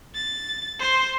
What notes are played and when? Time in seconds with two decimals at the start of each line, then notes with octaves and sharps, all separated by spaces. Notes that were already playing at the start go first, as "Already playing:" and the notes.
0.15 A6
0.79 C5 C6